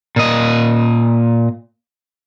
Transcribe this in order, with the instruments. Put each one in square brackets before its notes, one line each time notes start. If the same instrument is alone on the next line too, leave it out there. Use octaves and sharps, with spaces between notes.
[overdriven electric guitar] A#2 D#5